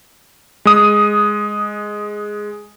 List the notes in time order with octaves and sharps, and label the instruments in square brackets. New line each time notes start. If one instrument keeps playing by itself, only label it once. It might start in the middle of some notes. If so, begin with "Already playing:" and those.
[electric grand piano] G#3 D#6